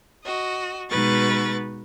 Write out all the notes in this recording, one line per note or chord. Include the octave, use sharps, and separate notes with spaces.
F#4 D#5
B2 G#3 D#4 B4 C#6 A6